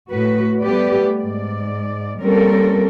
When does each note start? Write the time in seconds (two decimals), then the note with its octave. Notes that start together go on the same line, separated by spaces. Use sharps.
0.11 A2 F#4 B4
0.63 G3 A3 B3 G4 B4 D5
1.17 G#2 D5
2.22 G3 A#3 C4 C#4 A4 A#4